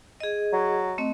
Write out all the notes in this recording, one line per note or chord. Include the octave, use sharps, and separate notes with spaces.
G#4 D#5
F#3
A3 C4 D#5